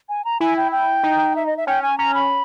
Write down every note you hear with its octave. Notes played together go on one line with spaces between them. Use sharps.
G#5
A#5
E4 G#5
G5
G5
D#4
E5
D#5
E5
C#4 G5
G#5
C#4 A#5
B5